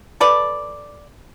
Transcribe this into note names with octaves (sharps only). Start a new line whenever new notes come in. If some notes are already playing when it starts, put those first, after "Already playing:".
A4 B4 D5